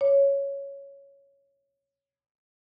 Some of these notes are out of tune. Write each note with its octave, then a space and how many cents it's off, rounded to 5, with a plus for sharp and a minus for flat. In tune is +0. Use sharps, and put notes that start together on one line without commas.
C#5 +5